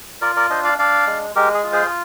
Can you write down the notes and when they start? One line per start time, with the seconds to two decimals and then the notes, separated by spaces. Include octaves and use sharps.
0.21 F4 A#4 D5
0.36 A#4 D5
0.50 D4 C5 D#5
0.64 D5 F5
0.79 D4 D5 F5
1.07 G#3
1.35 G#3 G4 A#4
1.54 G#4
1.64 F4
1.73 G#4 C5